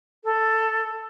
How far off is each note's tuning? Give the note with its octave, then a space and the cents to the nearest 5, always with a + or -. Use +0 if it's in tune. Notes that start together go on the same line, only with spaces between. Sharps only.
A4 +5